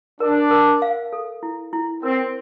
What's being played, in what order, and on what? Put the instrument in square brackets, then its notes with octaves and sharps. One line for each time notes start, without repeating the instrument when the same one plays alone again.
[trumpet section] D4 [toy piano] A#4
[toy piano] A#4
F5
A4
E4
E4
[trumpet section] C4 [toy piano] A#4